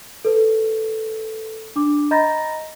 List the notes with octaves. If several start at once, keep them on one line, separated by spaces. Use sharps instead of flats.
A4 B4
D4 D6
D#5 A#5 B5 G6 A6 A#6